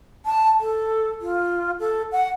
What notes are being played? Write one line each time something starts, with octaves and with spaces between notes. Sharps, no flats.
A5
A4
F4
A4
F#5